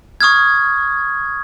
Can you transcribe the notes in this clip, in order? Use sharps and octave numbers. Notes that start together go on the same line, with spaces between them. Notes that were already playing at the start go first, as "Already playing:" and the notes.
C#6 D#6 F6 G#6